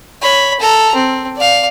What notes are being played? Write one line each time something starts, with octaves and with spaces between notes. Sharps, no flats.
C#5 B5
A4 A#5
C4
D5 F5